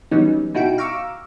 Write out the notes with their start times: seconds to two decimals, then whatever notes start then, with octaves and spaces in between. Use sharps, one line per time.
0.11 E3 F#3 G3 B3 C#4 D#4
0.54 B2 D#4 E4 F#4 G5 D7
0.78 F5 A#5 C#6 D6 E6